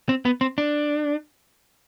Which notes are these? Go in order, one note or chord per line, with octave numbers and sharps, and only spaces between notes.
C4
B3
C4
D4